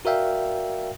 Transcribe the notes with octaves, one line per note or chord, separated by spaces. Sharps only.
F#4 A#4 D5 E5 F5 G5